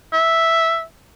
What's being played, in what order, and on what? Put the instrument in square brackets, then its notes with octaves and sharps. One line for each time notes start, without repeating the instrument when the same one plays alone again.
[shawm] E5